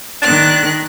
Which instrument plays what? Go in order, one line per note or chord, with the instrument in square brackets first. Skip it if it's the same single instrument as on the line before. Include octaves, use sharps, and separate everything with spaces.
[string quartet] D#3 F#6 [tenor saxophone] D4